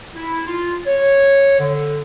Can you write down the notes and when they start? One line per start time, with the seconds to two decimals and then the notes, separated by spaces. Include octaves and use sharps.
0.15 E4
0.46 F4
0.87 C#5
1.59 D3